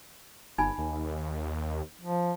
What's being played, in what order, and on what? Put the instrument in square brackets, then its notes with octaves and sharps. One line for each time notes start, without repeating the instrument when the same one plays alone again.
[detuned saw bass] G1 [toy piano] D#4 G#5 B5
[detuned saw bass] D#2
[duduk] F3